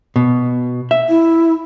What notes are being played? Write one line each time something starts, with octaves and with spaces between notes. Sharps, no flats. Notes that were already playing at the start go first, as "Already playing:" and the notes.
B2
E5
E4